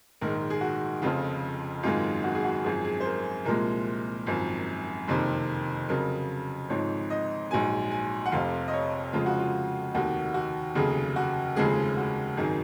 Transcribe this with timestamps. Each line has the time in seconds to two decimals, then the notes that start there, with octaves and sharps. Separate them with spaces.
0.21 A#1 G#2 D#3 G#3 A#4
0.50 G#4
0.61 F#4
1.02 F1 F2 C#3 F3 F4
1.83 G#1 F#2 D#3 G#3 F4
2.24 F#4
2.35 G#4
2.45 F#4
2.64 G#1 F#2 F3 G#4
2.84 G#4
3.00 C5
3.05 A#4
3.45 C2 A#2 F3 G#3 A#4
4.27 G#1 F#2 F3
5.07 F#1 F2 C3 D#3
5.89 F2 C#3 F#3 A#4
6.69 G#1 G#2 F3 C#5
7.10 D#5
7.51 A#1 G#2 F#3 G#5
7.91 G#5
8.26 F#5
8.32 F1 F2 C3 F5
8.68 D#5
8.73 C#5
9.13 F2 C#3 F3 G#3 F4
9.26 F#4
9.39 F4
9.94 F1 D#2 D#3 F#4
10.34 F#4
10.75 F1 D#2 C#3 F#3 G#4
11.16 F#4
11.56 F1 D#2 C#3 F3 G#3 G#4
11.97 F#4
12.37 G#1 F#2 D#3 F#3 G#4